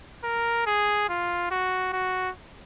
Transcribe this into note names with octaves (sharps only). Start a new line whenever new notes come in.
A#4
G#4
F4
F#4
F#4